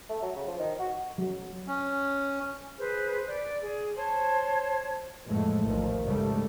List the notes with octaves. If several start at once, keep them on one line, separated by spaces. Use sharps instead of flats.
A3
F#3
C#3
F3
D#3
F#4
F#3
C#4
G#4 B4 C5
D5
G#4
C5 C#5 A5
F2 A2 E3 G#3 A3
A#1 D#2 D#3 F3
G#2 C#3 G3 A3